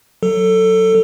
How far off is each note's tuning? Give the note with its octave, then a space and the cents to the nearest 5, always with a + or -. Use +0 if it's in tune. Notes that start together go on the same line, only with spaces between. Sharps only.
F#3 +0 A4 +15